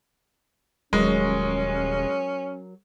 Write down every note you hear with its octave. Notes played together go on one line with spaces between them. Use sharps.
D#1 F#3 G#3 C#4 A#4